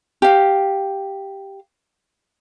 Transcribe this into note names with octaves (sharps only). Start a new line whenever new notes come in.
G4 F5